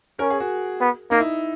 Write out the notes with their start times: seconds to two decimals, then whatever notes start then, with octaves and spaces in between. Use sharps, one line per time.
0.19 C#4 A#4
0.30 G#4
0.40 F#4
0.80 B3
1.11 A#3 D#4
1.20 E4